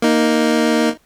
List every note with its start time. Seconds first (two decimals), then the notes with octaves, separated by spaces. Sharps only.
0.02 A#3 D#4